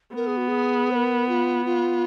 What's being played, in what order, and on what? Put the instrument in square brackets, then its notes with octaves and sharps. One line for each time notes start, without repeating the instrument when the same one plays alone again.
[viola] B3 [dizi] A#4
[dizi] G#4
F#4
G#4
C5
A#4
F4
F4